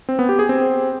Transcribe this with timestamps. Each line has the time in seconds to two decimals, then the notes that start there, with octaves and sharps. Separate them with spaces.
0.09 C4
0.19 B3
0.29 G4
0.39 G#4
0.49 C4